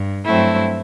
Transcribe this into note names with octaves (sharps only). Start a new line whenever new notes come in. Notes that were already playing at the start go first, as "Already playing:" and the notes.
Already playing: G2
G2 F#3 A3 C4 E4